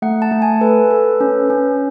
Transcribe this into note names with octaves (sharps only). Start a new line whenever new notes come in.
A3 F#5
A5
A3
G#5
A4 B4
A4
C#4
C#4